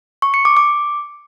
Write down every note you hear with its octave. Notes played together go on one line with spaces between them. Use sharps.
C#6
C#7
D6
D6